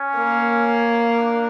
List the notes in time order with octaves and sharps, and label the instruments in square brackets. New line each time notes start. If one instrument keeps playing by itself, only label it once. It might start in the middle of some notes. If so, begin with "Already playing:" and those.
Already playing: [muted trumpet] C#4
[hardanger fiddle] A#3
[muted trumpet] D4